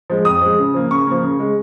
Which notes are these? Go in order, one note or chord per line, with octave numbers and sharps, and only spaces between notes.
F3 G#3
F2 D#6
F3 G#3
C#3
F3 A#3
C#3 C#6
F3 A#3
C#3
G#3